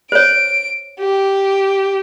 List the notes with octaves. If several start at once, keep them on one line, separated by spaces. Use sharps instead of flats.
C5 C#5 D7
G4